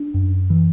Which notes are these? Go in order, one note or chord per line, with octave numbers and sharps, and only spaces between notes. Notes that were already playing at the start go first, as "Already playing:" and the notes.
Already playing: D4
F#2
E3